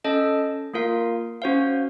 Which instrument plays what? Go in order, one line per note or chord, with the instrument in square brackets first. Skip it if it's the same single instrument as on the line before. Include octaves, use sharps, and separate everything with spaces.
[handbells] C#4 A4 D#5 A5
A#3 F4 A#4 F5
C#4 F#4 C5 F5